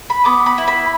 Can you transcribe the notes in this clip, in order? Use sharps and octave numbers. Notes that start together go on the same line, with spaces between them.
B5
B3 D6
B5
E4
B5